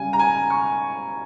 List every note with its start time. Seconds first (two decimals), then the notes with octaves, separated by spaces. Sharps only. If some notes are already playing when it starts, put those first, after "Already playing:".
Already playing: C#3 G3 G#5
0.13 A#5
0.19 G#5
0.50 C#6